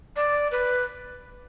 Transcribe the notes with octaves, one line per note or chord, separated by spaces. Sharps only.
D5
B4